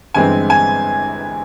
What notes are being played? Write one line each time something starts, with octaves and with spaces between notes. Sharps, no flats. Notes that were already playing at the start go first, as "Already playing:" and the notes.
G1 G2 E3 G#3 C4 G#5
G#5